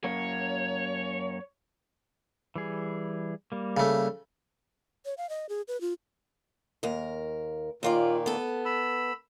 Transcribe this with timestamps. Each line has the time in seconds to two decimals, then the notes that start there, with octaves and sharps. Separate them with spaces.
0.04 F#2 A#3 C#5
2.55 E3 G3 G#4
3.52 G3 A#3
3.77 C#3 A3
5.05 C#5
5.18 F5
5.29 D#5
5.49 G#4
5.68 B4
5.81 F4
6.83 D#2 A#4
7.83 D#2 A#2 D#3 A#3 F4 D5
8.26 B3 A4
8.65 B5 E6